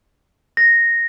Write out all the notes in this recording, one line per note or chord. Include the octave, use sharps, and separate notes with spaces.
A#6